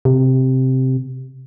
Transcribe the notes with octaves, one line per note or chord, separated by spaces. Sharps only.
C3